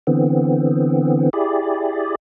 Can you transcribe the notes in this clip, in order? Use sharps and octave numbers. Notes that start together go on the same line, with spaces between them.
D3 E3 B3 C4
E4 G4 G#4 D5